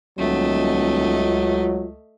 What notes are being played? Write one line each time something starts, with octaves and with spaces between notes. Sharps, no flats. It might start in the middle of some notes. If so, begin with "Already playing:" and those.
D#1 C#2 F#3 A3 D#5